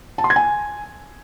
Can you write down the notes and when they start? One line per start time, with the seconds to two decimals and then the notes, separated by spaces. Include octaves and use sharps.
0.18 A5
0.24 C6
0.30 G#6
0.36 G#5